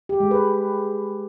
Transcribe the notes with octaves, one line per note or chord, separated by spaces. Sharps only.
G4
G#3
B4